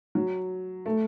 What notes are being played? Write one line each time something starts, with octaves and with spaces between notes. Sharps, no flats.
F#3
A3